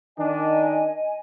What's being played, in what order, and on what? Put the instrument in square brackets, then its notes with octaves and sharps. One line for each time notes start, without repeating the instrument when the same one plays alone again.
[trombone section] D#3 D4 [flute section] D#5 G#5